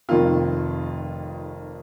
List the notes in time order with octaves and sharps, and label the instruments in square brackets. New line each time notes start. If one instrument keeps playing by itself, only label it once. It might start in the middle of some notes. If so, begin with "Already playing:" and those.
[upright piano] F1 F2 D#3 A#3 F4